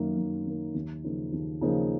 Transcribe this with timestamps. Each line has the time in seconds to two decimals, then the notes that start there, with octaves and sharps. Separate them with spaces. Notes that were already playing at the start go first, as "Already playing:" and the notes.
Already playing: F#2 D#3 A#3
0.18 F#2
0.46 D#3 A#3
0.74 D#2
1.04 C#3 F3 A#3 D#4
1.32 D#2
1.61 C#3 F3 A#3 D#4